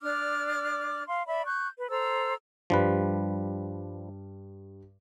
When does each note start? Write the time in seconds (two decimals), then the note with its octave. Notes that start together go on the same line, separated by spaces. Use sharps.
0.02 D4 D5 D6 F6
1.08 F5 C6
1.27 D5 E5 B5
1.47 C#6 F#6 G6
1.77 B4
1.90 A4 C5 A#5 E6
2.70 G2 F3 G3 B4